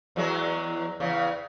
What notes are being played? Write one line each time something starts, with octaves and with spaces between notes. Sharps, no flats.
E2 F#3 G#3
E2 C#3